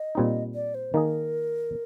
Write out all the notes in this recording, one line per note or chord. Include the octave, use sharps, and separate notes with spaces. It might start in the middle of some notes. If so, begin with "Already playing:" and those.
Already playing: D#5
A#2 G3 C4 D#4
D5
C5
D#3 A#3 D#4 G#4 A#4 D#5